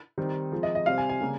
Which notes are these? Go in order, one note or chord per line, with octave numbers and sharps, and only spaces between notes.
D#3 G3 C4 D#4
F3 G#3 C4
D#5
D#5
C3 G3 C4 F5
G#5
G#5
C#3 G3 A#3